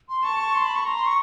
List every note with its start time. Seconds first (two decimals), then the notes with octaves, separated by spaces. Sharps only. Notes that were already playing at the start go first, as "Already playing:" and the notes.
0.09 C6
0.23 A5 C#6
0.39 C#6
0.55 C6
0.64 B5
0.75 C#6
0.86 A#5 C6
0.96 C6
1.06 C#6